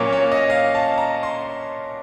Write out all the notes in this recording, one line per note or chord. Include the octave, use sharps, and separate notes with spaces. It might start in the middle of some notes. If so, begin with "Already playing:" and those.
Already playing: A#2 F#3 A#3 C#4 C#5 F5
C#5
D#5
F5
A5
A#5
C6